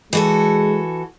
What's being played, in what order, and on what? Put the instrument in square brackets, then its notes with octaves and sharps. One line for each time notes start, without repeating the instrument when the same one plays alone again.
[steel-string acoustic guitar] E3 F#4 A4 [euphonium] G#3